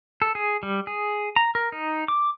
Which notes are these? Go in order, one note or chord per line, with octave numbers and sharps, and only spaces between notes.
A4
G#4
G3
G#4
A#5
A#4
D#4
D6